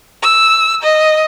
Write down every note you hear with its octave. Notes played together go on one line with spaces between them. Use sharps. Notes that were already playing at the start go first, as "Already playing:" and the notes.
E6
D#5